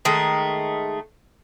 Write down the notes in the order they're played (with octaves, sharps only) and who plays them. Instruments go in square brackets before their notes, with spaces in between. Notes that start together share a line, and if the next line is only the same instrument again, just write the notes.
[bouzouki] D#3 G#3 A3